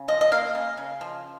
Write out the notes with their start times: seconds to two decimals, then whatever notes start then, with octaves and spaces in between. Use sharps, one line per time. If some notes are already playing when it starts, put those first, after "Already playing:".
Already playing: C#3
0.08 F3 D#5
0.21 D#5
0.32 A#3 F5
0.55 C#3
0.77 C#3
1.01 F3